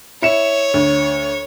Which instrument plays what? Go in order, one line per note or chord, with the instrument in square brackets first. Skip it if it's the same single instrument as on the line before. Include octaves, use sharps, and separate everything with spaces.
[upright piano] E4 C#7 E7 [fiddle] C#5
[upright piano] D2